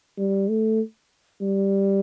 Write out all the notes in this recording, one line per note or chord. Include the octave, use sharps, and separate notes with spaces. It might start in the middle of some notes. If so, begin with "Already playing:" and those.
G3
A3
G3